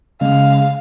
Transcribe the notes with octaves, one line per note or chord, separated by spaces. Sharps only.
C#3 G#3 F5